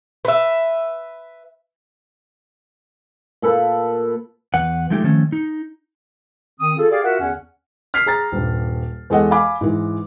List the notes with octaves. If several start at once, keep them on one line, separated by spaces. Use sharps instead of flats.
B4 E5
A#2 A4 B4
E2 B4 F#5
F3 G#3 A3 D#4 G4
D#3 F3 A3 C#4
D#4
D#3 C4 D#6
F4 G#4 A4
G4 G#4 D5 F5
F4 F#4 A#4 E5 F#5
E2 D3 C#4 F#5
F6 B6 C7
G#4 A#5 A6
D#1 G2
E2 G#3 A4 D#5 F#5
F5 G#5 B5 D6
G#2 E3